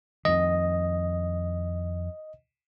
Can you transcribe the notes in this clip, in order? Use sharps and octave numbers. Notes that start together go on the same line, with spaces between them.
F2 D#3 D#5